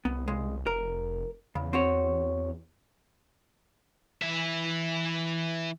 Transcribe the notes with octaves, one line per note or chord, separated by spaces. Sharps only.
C2 B3
C#2 G#3
F1 A#4
E2 C#3
C4 F#4 C#5
E3 E5